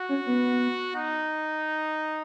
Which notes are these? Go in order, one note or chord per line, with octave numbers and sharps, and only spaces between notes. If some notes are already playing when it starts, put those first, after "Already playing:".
Already playing: F#4
C#4
B3
D#4